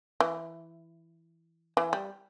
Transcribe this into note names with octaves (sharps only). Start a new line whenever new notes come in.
E3
E3
G3